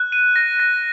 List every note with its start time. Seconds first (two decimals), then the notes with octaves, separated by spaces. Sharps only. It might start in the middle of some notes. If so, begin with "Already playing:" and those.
Already playing: F#6
0.12 D#7
0.36 A#6
0.60 A#6